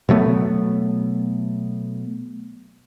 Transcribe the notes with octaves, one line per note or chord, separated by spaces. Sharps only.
B2 F#3 A3 B3